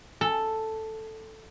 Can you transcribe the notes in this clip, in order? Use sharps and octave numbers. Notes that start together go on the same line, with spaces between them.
A4